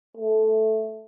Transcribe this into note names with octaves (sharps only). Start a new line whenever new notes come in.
A3